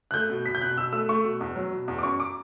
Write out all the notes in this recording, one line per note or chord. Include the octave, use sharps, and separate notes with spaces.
F#6
A3 G6
B2
B2 B6
G6
B2 F#6
B2 E6
A3 E6
A3 C#6
B2
E2
F#3
B2
E2
D6
F#2 C#6
D6